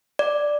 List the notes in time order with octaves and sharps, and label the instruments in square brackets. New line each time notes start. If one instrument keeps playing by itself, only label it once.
[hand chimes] D5